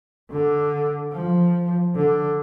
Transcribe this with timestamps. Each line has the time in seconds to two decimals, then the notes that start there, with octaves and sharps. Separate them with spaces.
0.31 D3
1.12 F3
1.96 D3